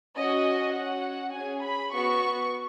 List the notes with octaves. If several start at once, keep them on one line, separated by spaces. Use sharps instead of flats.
C#4 F#4 D#5
C#4 F#4 F#5
C#4 G#4 G#5
B5
B3 F#4 C#6